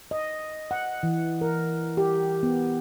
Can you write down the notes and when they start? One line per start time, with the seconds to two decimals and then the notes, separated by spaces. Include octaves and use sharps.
0.11 D#5
0.71 F#5
1.03 E3
1.41 A#4
1.97 G4
2.43 B3